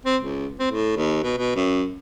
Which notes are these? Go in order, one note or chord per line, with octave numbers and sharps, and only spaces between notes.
C4
C#2
C4
A2
D#2
B2
B2
F#2